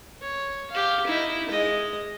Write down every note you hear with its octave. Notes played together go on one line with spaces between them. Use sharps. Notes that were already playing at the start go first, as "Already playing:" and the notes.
C#5
G4 F5
D#4 E4
G#3 D#5